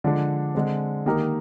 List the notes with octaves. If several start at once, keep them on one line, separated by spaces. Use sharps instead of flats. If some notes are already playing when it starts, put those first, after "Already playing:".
D3 F3 G#3 D4
D3 G#3 C4
D#3 A#3 D#4 G4 A#4